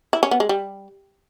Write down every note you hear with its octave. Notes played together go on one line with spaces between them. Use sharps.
E4
C#4
B3
G#3
G3